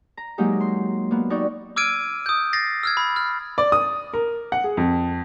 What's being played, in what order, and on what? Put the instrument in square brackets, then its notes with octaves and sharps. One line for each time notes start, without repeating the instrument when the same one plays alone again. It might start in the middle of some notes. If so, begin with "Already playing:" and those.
[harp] A#5
F#3 G#3 A#3 D#4 G4
C6
A#3 B3
D#4 F#4 D5 G5 C#6
[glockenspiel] D6 E6 F6 G#6 D7 D#7
D#6 G6
A6 A#6 C7
E6 F6 G#6
B5
F6
[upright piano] D5
D#6
A#4
F#5
G#4
F2